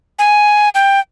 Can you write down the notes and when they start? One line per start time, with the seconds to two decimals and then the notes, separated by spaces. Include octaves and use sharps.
0.19 G#5
0.75 G5